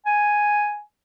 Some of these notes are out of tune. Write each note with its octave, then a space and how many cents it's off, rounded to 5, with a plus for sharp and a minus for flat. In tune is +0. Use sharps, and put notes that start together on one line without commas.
G#5 +0